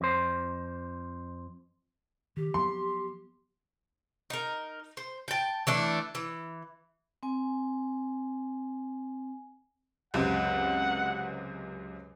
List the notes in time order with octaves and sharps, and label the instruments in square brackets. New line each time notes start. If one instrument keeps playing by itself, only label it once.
[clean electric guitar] F2 C5
[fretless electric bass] D#3 [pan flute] G4
[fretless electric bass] F3 F#3 B3 [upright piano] C6
[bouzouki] D#4 A#4
C5
G5 A5
E3 A3 D4
E3
[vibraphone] C4 G#5
[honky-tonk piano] C#2 F#2 C3 [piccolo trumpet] F#5